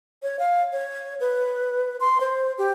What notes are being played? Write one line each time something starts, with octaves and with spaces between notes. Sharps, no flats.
C#5
F5
C#5
B4
C6
C5
G4